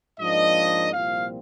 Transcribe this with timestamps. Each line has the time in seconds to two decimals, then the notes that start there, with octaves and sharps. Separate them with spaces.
0.20 G#2 F3 A#3 D4 D#5
0.93 C2 A#2 F3 C4 F5